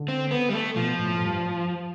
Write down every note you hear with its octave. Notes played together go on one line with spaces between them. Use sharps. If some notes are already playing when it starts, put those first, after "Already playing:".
Already playing: D3
C4
B3
G3
A3
B2 F3
A2
G2